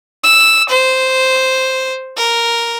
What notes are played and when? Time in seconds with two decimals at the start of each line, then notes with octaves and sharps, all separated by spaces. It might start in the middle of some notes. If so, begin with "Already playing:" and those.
0.23 E6
0.69 C5
2.17 A#4